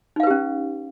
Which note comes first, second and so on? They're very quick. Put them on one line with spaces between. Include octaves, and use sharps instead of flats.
D#4 F5 B4 G4 C#4